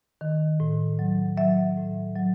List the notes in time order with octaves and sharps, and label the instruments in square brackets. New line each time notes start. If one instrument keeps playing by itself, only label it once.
[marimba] D#3
A2
F#3
F#3 E5
A2
F#3